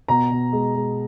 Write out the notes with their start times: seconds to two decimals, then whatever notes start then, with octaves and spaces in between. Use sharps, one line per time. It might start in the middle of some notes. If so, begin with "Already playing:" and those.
0.08 B2 A#5
0.31 B2
0.53 G#3
0.75 G#3